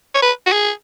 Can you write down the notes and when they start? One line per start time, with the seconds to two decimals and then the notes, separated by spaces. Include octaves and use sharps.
0.15 C#5
0.22 B4
0.46 F#4
0.52 G#4